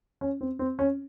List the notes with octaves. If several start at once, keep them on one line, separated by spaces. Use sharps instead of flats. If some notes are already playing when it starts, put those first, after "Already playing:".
C#4
C4
C4
C#4